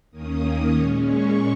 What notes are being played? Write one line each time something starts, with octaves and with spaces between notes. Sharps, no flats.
D#2 D#3 A#3 C#4 D#6
A#2 G#3 C#4 C#6
C#6